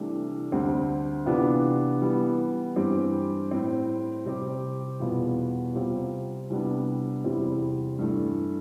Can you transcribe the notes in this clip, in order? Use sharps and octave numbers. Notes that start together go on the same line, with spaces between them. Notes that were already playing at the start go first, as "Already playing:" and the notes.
Already playing: C2 C3 E3 A3 D4
D2 D3 G3 C4
C3 E3 B3 D4 F4
E3 G3 B3
G2 E3 G3 C4 G4
A2 G3 C4
C3 G3 C4 G4
E2 B2 G3 B3 F4
C3 G3 C4 F4
C2 C3 G3 B3 D4
E2 C3 G3 C4 E4
G2 E3 A3